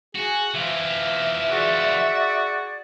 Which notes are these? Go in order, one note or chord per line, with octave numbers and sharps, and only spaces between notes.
F#4 G#4
E3 F4 E5
F#4 G#4 D5